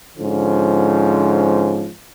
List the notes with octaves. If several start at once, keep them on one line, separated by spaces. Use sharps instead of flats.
G#2 D3 F3 C#4